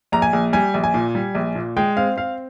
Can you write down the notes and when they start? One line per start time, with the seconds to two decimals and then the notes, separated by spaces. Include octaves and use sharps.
0.12 A#1 A#5
0.22 G#5
0.33 A#1
0.53 G3 G#5
0.74 A#1
0.84 G#5
0.94 A#2
1.15 G3
1.35 A#1
1.55 A#2
1.77 G#3 G5
1.97 C4 F5
2.17 C4 F5